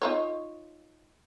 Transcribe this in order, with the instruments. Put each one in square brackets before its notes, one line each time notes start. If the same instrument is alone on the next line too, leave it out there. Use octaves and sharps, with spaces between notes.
[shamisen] D#4 F4 C#5